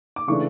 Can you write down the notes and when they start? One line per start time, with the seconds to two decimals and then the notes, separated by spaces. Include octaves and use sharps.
0.16 D6
0.27 C#3 E3 A3 D4 C#6